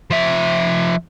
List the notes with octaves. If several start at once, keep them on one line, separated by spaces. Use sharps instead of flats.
F3 E5